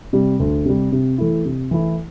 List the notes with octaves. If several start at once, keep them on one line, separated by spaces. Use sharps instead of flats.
C3 G3
D2
C3 G3
C3
E3 A3 E4
C3
E3 A3 E4